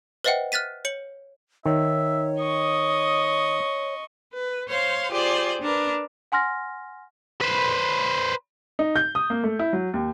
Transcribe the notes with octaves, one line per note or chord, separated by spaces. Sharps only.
B4 C5 D#5 E5 F#5 G5
F6 F#6 A6 B6 D#7
C#5 C#7 F#7
D#3 C#5 E5
D#5 C#6 D#6
B4
C5 C#5 F5 C6
F4 G4 G#4 C5 D5
D4 A#4 B4
F#5 G#5 C6 F6 A#6
B4 C5
D#4
G6
D#6
A#3
A3
E4
F#3
D#2